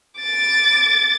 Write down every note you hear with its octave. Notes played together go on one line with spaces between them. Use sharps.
D6 A6